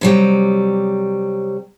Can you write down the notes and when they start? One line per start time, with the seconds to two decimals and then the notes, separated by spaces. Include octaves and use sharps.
0.01 C3 F#3 G3